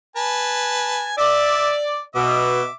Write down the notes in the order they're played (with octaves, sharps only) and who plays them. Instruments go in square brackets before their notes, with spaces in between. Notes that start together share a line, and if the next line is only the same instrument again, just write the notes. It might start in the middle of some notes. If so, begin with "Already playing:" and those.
[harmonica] B4 G#5 A5
[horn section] D5 [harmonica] E5
[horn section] B2 [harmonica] E5 D6